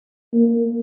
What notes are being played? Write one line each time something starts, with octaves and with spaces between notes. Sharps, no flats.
A#3